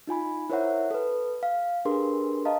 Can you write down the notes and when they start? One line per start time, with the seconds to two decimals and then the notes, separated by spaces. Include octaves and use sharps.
0.07 D#4 F4 G#5 B5
0.50 E4 A#4 C5 C#5 E5 F#5
0.91 A4 B4
1.43 F5
1.85 D4 G4 G#4 A#4 B4 C6
2.45 D#5 F5 A5 A#5